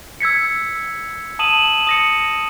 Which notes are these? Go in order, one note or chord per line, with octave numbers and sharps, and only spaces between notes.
E6 G#6 B6 C#7
A5 D#6 D#7 E7 F#7
D#6 A#6 C#7